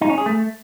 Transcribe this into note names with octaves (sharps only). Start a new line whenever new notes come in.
D#4
C#4
G#4
A3